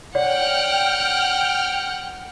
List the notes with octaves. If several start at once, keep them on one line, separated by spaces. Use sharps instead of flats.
C#5 D5 F#5 G5 F6